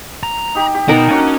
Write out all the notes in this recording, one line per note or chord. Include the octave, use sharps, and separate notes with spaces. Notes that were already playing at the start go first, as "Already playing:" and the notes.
A#5
D#4 G4
G4
B2 B3 D#4 A#4 F#5
A#3 C#4 D4 F#4 G#5